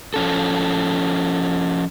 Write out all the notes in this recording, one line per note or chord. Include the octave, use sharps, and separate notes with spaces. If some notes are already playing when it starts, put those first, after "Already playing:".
F3 C#4 A4